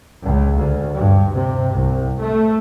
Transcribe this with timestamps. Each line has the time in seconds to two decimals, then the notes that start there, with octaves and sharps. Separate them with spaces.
0.23 C#2
0.57 D2
0.96 G2
1.34 C3
1.73 C2
2.20 A3